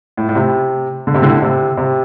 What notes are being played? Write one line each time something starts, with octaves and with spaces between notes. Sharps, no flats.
A2
A2
C3
D3
C3
A2 D3
C3
C3